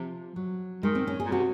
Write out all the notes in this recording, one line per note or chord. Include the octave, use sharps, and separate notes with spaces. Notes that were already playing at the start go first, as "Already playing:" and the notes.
Already playing: C3 F3
F#3
D#3 G#3
C4
C#4
G#4
A#2
C3 F#4